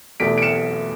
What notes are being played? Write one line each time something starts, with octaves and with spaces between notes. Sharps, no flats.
E2 B2 A3 B6 D7
D7
C#7 E7